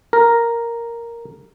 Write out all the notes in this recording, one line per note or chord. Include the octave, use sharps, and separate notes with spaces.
A#4